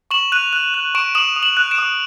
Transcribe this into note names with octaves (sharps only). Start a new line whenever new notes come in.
C#6 E7 F#7
F#6 D#7 F7
F#6
F#6
C#6 D7 E7
D#6 E7 F#7
D#6
E7 F#7
F#6
D7 E7
D#6